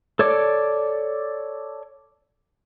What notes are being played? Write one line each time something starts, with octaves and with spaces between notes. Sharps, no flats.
A4 C#5 D5 D6